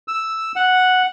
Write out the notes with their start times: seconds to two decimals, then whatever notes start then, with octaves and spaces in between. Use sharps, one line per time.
0.08 E6
0.56 F#5